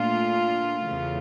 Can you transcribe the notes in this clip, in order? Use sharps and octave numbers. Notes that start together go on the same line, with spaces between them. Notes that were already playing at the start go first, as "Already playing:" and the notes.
Already playing: A#2 A3 D4 F4
E2 C#3 E3 A3